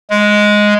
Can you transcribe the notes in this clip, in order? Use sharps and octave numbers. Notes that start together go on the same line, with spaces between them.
G#3